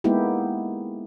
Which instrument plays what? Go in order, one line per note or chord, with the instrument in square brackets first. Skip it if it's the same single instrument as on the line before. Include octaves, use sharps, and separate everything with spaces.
[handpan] G#3 A#3 B3 D#4 E4 G4